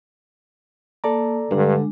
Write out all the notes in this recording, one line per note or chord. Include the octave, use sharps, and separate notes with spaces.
A#3 A4 D5 A5 A#5
G2 D3 G#3 D4